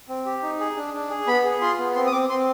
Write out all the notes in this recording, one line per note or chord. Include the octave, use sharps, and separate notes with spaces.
C4
G4
D#4
G#4
D4
D4
G#4
B3 B5
G#4
F4 C6
B3
C4 C6
D#6
C4 D6
C4 C6